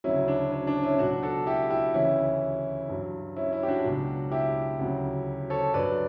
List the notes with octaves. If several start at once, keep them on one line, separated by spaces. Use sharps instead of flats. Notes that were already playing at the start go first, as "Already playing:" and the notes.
D2 C#3 F#3 C#4 E4
D4
C#4
D4
C#4 E4
C#2 B2 F#3 D4 F#4
F#4 A4
E4 G4
E4 G4
D2 C#3 E3 C#4 E4
G2 F#3
C#4 E4
C#4 E4
G4
D4 F#4
C#2 B2 F#3
E4 G4
D2 C#3 F#3
A4 C#5
G2 F#3 B4 D5